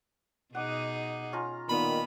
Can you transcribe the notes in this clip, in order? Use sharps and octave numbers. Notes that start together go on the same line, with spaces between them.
B2 D#4 G#4 F#5 D6
C#4 F4 A#5
A#2 D#3 B3 B5